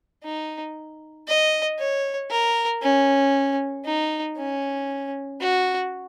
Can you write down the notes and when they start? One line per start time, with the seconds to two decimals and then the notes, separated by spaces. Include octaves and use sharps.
0.23 D#4
1.27 D#5
1.79 C#5
2.31 A#4
2.82 C#4
3.85 D#4
4.37 C#4
5.41 F#4